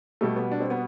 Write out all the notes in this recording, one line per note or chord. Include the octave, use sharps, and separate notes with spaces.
B2 G3 A3
B3
D4
C4
B3